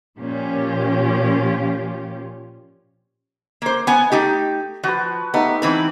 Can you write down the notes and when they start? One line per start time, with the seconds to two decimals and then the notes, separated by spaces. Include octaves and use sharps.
0.19 A#2 F3 C#4 F4 G4
3.62 A#3 C5
3.87 B3 F#5 G#5
4.12 A3 D#4 G4
4.83 F3 F#4 B4
5.34 A3 B3 D#4 G4
5.62 E3 C4 B4